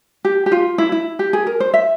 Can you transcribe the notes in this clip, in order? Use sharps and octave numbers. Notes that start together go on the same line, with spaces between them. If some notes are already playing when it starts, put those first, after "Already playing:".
G4
G4
F4
E4
E4
G4
G#4
A#4
C5
E5